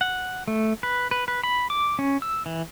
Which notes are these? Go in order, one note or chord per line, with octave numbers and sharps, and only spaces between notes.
F#5
A3
B4
B4
B4
B5
D6
C#4
E6
E3